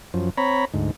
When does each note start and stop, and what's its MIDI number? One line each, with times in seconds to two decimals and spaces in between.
0.14 0.30 42
0.14 0.30 53
0.38 0.65 60
0.38 0.65 73
0.38 0.65 82
0.38 0.65 83
0.74 0.91 38
0.74 0.91 44